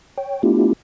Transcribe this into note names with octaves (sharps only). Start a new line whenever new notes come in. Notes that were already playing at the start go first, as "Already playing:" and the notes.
C#5 G5
A3 B3 D4 E4 F4 G4